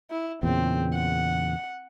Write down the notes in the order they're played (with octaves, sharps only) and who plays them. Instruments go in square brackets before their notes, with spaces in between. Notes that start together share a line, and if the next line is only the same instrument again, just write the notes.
[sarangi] E4
[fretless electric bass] E2 A#2 C#3 [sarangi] C4
[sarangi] F#5